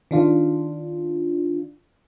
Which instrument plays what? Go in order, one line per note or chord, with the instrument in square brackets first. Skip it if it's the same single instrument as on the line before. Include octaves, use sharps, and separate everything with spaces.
[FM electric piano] D#3 D4 F4